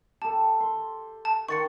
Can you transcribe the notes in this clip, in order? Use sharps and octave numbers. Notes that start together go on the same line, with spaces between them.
G4 A4 A5
C6
A5
D#3 F#5 C6 C#6 A6 C#7